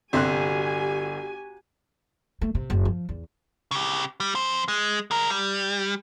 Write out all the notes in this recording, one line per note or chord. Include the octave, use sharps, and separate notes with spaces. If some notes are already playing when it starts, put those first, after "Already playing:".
G1 C3 F#4 G4 G#5 C6 F#6
A3
C3
F#1
F3
E2
C#3 G4
G3
F2 C5
G#3
G#3 A#4
G3